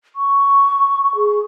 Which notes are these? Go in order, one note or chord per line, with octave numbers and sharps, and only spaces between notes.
C#6
G#4